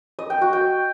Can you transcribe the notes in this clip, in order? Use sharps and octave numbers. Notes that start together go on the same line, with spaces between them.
D#5
G5
F#4
G5